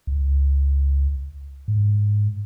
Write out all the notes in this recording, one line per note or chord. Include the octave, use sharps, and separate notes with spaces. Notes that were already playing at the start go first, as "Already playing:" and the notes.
C#2
G#2